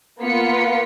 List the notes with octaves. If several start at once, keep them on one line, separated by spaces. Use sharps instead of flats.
A#3 B3 F4 B6 C#7